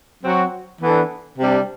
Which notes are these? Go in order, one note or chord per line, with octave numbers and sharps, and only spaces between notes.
F#3 C4 F#4
E3 B3 D4 A4
C3 G3 D4